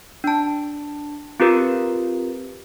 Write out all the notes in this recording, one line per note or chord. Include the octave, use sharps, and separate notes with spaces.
D4 A5
C4 F4 G4 A#4 B4